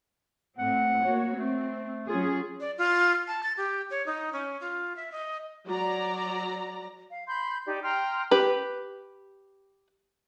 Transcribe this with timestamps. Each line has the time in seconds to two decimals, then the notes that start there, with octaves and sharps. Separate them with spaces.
0.58 A2 C4 F#5
1.04 A#3 F#4 C#5
1.35 A3 C4
2.09 F#3 C#4 F4 G#4
2.60 D5
2.78 F4
3.28 A5
3.43 A6
3.57 G4
3.91 C#5
4.06 D#4
4.33 C#4
4.61 F4
4.96 E5
5.12 D#5
5.66 F#3 D5 A#5
7.10 F5
7.27 B5 C6 G6
7.66 D#4 G4 D5
7.83 G5 A#5 C6 F6
8.31 G4 B4